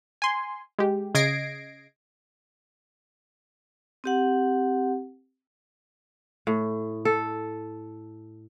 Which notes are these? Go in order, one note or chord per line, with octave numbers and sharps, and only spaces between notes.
G#5 C6
G#3 G4
C#3 D#5 G#6 A#6 C7 D7
C4 G4 F#5
A2
A4